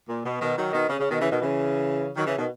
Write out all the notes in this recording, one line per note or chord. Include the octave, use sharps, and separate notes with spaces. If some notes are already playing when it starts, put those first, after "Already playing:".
A#2
B2
B2 D#3
D#3 F#3
B2 D#3
C#3
C#3
B2 D#3
C#3 E3
B2 D#3
C#3 E3
D#3 F#3
C#3 E3
B2 D#3